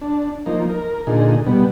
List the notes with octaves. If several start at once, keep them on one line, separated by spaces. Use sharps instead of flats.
D4
F3 A#3 D#4
A#4
A#2 D3 D#4 G#4
B2 G3 B3